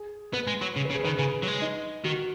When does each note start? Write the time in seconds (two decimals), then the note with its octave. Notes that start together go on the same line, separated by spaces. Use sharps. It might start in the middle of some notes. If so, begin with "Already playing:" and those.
Already playing: G#4
0.33 B3 B4
0.47 G#3
0.62 F#3
0.76 C#3
0.85 B4
0.90 C#3
0.95 G#4
1.04 D#3 B4
1.18 C#3 G#4
1.42 F#3
1.47 G#3
1.62 D#4
2.04 D#3 F#4